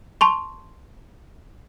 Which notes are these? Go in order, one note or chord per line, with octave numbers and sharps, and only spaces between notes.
A5 C6 C#6